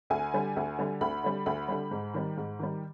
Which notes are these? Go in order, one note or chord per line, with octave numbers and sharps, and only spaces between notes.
D2 G#5
D3 G3
D2
D3 G3
D2 B5
D3 G3
D2 B5
D3 G3
G#2
D#3 G3
G#2
D#3 G3